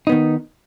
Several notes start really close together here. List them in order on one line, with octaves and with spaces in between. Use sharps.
D#4 B3 D#3